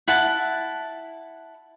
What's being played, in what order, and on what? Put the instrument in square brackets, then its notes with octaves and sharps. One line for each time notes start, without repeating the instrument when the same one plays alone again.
[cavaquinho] E4 F#5 A5